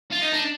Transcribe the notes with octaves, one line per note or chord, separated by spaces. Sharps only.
F4
D#4
D4